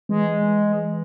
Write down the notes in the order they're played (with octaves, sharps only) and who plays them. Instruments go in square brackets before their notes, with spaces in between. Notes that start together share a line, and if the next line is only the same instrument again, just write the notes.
[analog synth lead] E3 [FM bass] G#3